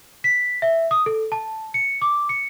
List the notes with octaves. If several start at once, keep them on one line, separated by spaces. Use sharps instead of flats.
B6
E5
D#6
A4
A5
C#7
D6
C#7